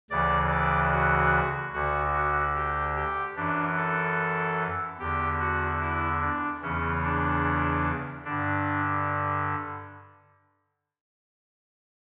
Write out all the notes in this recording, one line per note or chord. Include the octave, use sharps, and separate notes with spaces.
D2 C#3 E3 D5
D5
F#4
D2 D3 F#4
F#4
G4
G4
F#2 E3 D4
A4
E2 D3 G4
F#4
E4
D4
E2 C#3 E3 C#4
D4
G2 D3 D4